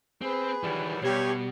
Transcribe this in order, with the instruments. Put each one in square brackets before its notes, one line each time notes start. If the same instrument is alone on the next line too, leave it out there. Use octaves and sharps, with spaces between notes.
[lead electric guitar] C4 [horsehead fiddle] G#4 B4
[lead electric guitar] D#3 E3 [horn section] F#3 G3
[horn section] G2 C#5 [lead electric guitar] B2 [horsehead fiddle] G3 [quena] G4